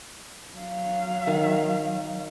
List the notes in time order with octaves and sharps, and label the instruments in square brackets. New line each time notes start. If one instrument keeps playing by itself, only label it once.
[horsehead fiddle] F#3 F5
[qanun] D#3